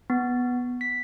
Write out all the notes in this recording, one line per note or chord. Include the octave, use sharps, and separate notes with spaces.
B3
B6